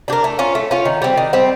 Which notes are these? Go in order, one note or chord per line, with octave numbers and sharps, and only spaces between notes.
D4 G4 A#4
A3
C#4 F4
A3
C#4 F4
D#3
G3 C4
D#3
G3 C4